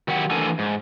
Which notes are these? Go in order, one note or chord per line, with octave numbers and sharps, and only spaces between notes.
D#3 F#3 G4 F#5
E3 A3 D4 A4 A#4 G#5
G#2